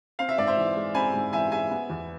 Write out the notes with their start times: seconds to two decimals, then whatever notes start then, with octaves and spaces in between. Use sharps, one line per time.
0.19 C4 F5
0.29 E5
0.38 G#2 D5
0.47 C5 E5
0.57 E3
0.76 G#3
0.95 C4 G#5 B5
1.14 G#2
1.33 E3 E5 G#5
1.52 G#3 E5 G#5
1.71 B3
1.90 E2